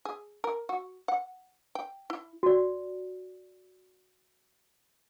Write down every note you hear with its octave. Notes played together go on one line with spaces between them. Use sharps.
G#4
A#4
F#4
F#5
G5
E4
F#4 D5